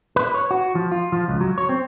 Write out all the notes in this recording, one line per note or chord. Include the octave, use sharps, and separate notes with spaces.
B4
C#5
F#4
F3
F4
F3
C#2
F#3
C#5
C4